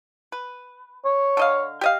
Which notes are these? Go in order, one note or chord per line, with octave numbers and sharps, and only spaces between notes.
B4
C#5
D3 D#5 F5
G4 D#5 F5